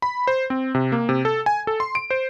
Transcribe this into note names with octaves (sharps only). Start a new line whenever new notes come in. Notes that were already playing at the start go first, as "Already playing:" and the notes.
B5
C5
C4
C3
A#3
C3
A4
G#5
A4
C6
D7
C5